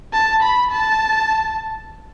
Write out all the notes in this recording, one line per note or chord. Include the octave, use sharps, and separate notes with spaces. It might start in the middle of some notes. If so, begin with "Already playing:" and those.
A5
B5
A5